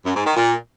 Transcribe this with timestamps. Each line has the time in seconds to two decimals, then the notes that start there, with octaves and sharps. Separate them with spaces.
0.06 F#2
0.16 G#2
0.26 D#3
0.37 A#2